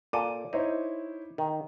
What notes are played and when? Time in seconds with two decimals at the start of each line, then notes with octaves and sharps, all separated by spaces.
0.13 A#2 A4 D6 D#7
0.53 D#4 E4 C5 C#5
1.38 D#3